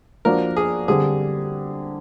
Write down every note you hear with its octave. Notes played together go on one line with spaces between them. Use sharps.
F3 A#3 D4 F#4 A#4
G#4
D3 G3 C4 G#4